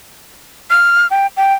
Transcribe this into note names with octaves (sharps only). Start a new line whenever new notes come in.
F6
G5
G5